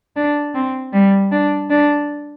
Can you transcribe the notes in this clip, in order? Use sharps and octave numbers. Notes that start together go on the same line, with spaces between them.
D4
C4
G3
D4
D4